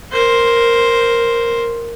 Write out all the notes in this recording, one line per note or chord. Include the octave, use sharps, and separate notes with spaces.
A#4 C5